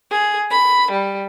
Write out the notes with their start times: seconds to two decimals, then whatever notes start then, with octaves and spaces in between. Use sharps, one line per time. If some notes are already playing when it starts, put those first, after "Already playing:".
0.11 G#4
0.51 B5
0.91 G3